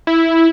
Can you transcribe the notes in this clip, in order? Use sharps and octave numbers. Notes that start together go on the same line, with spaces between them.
E4